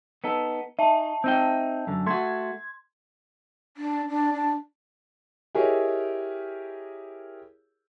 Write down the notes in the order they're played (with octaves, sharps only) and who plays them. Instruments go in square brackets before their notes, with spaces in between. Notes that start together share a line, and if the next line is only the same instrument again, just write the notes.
[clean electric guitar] B3 D#4 A4
[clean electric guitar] D#4 [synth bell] E5 A5
[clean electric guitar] C4 D#4 G5
F#2 D3
[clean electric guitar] A3 F#4 [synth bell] C6 G#6
[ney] D4
D4
D4
[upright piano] E4 G4 G#4 A#4 C#5 D#5